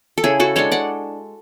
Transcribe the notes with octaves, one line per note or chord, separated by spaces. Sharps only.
A4
C#3 E4 G#4
F#4 A4
G#3 D4 A4 C#5
D5 F#5